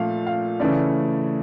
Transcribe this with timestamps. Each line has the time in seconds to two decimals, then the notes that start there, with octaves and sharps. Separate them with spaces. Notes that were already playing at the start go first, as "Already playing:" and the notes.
Already playing: A#2 F3 A3 F5
0.26 F5
0.60 C#3 E3 A3 C#4 D5